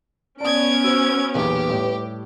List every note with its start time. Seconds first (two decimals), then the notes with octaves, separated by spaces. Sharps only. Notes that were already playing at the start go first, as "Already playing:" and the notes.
0.41 B3 C#4 D5 A5 D#6 G#6 D7
0.84 F#4 C5 E6
1.35 B1 E2 A#2 G4 B4
1.70 A2 G3